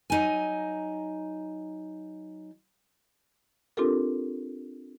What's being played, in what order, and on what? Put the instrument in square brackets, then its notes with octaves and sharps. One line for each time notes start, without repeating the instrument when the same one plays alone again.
[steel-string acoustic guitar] F#3 D#4 G#5
[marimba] C4 D4 F4 G4 A4 A#4